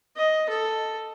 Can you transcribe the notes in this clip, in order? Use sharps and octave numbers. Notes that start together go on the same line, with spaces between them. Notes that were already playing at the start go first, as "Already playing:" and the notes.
D#5
A4